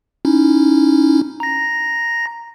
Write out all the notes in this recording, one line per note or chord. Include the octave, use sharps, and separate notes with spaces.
C#4 D#4 E4
A#5 A#6